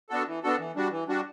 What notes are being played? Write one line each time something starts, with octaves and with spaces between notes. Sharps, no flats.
B3 D4 F#4 A4
E3
B3 D4 F#4 A4
E3
G3 D4 F#4
E3
G3 D4 F#4